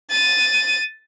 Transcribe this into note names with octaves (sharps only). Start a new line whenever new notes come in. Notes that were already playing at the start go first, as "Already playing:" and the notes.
A6 D#7